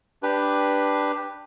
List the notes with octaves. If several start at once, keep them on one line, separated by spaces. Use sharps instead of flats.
D4 G4 B4